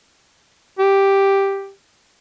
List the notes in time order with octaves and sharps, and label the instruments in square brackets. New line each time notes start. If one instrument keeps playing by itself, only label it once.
[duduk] G4